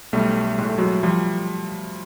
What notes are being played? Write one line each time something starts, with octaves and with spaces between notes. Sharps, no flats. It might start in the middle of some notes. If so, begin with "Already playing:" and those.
B1 G3 A3
A2 G#3
A3
F#3 G#3
F3 G3